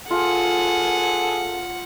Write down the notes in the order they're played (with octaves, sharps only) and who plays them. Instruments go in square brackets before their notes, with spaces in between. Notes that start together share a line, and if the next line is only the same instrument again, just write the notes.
[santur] F4 [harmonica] G#4 A4 [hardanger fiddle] F#5